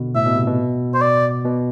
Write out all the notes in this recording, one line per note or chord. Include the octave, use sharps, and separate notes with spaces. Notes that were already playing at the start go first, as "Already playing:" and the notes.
Already playing: B2 D3
A2 E5
B2
C3
B2
C5
D5
B2